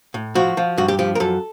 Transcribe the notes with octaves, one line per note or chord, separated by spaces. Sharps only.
A2
F3 F#4
F3
G2 F#4
G4
F3 G4
A#4
F#2 A4